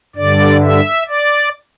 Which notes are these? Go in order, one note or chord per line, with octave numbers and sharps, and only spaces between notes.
G2 D3 D5
E5
D5